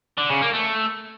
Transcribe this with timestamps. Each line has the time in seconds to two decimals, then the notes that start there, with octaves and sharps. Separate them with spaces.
0.18 D3
0.29 C#3
0.41 A#3
0.53 A3